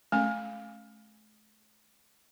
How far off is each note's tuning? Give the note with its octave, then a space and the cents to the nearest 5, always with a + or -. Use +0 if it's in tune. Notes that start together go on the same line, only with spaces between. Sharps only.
A3 -40 C#4 -25 G#5 -25